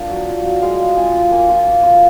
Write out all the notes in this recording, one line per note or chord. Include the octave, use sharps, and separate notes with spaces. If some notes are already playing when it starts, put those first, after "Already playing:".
Already playing: A#3 D4 F4 D5
F#3
F4
F#3
G#3 F5
G#3
F4 G#5
F4
A#3 G#5
F4
F4
F4